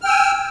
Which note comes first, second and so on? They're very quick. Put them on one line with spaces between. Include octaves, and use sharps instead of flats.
F6 G5 E6 G#5